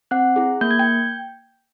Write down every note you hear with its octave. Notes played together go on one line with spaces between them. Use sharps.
C4 F#5 F#6
E4 G#4
A#3 G6
G#6
G5 G6